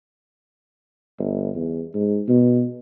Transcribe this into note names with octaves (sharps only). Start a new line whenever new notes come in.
G1
E2
G#2
B2